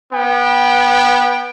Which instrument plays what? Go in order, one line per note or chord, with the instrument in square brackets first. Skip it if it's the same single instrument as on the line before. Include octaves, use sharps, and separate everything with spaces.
[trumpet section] B3 G5